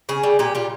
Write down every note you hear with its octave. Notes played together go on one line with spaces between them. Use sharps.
C#3 G#4
G3
A#2 G4
G3 F4